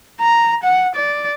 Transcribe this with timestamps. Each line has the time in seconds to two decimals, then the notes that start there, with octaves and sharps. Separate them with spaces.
0.20 A#5
0.64 F#5
0.96 D5